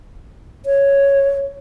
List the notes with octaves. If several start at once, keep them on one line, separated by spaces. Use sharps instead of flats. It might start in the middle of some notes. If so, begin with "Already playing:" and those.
C#5